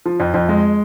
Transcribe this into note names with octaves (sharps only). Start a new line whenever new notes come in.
F3
F2
F2
G#3